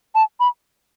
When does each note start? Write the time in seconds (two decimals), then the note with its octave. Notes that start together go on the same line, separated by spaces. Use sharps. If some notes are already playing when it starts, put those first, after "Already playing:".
0.15 A5
0.40 B5